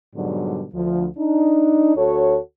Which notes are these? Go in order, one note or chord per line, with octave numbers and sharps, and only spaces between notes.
G#2 B2 D3 F#3 G3
D2 F3
D4 D#4
D2 F#4 A4 C#5